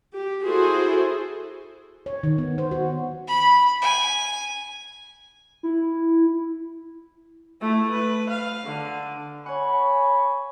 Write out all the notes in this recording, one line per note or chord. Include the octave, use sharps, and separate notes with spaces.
G4
E4 F#4 G#4 A4 C5
C#5
D#3
B3
C5
F#4
B5
G#5
E4
A3 E4
B4
F5
D3
C#5 F#5 G#5 B5 C#6